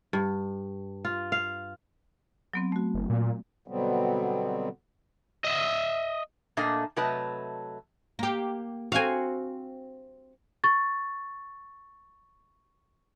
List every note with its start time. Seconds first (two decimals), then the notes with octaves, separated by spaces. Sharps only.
0.13 G2
1.05 F4
1.32 F5
2.54 F#3 B3 C4
2.72 A3 F#4
2.94 F#1
3.10 A#2
3.68 B2 D3 F#3 G3 B3 C4
5.45 D#5 E5
6.57 A#2 A3 A#3 D4 D#5
6.96 C3 F#3 A3 B4 D#5 A5
8.19 A#3 G4
8.92 C4 F#4 F5 G#5
10.64 C#6 A6